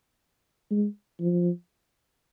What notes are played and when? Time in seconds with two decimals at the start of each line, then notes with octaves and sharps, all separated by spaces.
0.71 G#3
1.20 F3